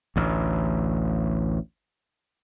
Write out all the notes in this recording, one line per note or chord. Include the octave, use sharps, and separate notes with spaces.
A1 D2